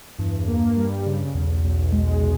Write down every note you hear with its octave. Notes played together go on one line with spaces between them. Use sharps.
E2 G2
A#3
G3
C#3
B1 E2
B1
G#3
B2